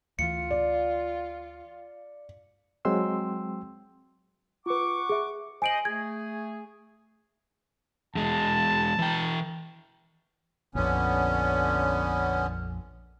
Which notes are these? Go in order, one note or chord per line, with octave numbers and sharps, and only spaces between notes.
D2 E3 F4 C#7
D5
F#3 G#3 C4 G5 C6 E6
F4 B4 F#5 C#6 D6
G#4 E5
C5 D#5 G#5 D7 F#7
A3 G#4 G#6
E2 G#3 A5
E3 G5
A#1 F2 D3 B3 C#4